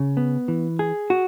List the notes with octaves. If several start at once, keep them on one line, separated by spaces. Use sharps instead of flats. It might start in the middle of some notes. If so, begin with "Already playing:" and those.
Already playing: C#3
B3
E3
G#4
F#4